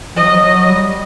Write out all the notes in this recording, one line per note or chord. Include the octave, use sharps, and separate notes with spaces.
F3 D#5
F#3
F3
F#3
G3